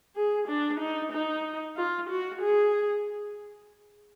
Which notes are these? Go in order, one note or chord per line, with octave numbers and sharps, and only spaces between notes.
G#4
D4
D#4
D#4
F4
F#4
G#4